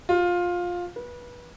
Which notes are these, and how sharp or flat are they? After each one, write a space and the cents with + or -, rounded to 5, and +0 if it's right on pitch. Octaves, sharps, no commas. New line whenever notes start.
F4 +15
B4 -25